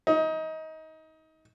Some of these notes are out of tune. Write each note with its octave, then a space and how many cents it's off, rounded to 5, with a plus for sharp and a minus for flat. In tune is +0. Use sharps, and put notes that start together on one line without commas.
D#4 +25